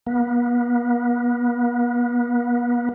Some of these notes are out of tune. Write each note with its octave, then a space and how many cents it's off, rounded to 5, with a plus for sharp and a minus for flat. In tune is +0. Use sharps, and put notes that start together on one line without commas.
B3 -40